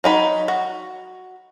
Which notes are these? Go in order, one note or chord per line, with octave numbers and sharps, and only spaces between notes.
F#3 D#4 B5
F#4